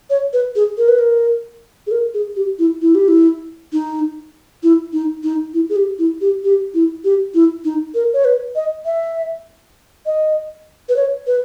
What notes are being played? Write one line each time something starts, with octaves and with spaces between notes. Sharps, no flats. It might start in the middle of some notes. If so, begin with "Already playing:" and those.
C#5
B4
G#4
A#4
B4
A#4
G#4
A#4
G#4
G4
E4
E4
G4
E4
D#4
E4
D#4
D#4
E4
G#4
G4
E4
G4
G4
E4
G4
E4
D#4
A#4
C#5
B4
D#5
E5
D#5
B4
C#5
B4